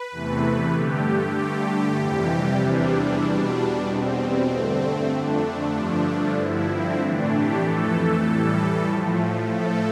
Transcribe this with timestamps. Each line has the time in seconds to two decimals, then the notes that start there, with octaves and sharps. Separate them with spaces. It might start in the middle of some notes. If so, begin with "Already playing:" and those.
Already playing: B4
0.11 E2 C3 E3 A3
0.73 G2 D3 A3 G4
1.36 G2 D3 A3 G4
1.99 F2 C3 E3 G3
2.61 E2 C3 E3 G3 D4
3.24 E2 B2 G3
3.86 E2 B2 G3 C4
4.49 G2 D3 A3
5.11 F2 D3 A3 D4
5.74 G2 D3 F3 A3
6.37 G2 D3 F3 E4
6.68 C4
6.99 A2 E3 A3 D4
7.30 G4
7.61 F2 E3 A3 A4
8.24 A2 E3 G3
8.87 A2 F3 A3
9.49 A2 F3 A3 A4